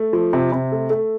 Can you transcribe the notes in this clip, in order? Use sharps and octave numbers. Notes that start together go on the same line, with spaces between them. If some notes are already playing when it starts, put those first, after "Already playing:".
Already playing: A3
F3
C3
C3
A3
A3